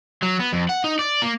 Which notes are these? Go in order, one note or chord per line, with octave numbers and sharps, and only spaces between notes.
F#3
B3
F2
F#5
D#4
D5
A#3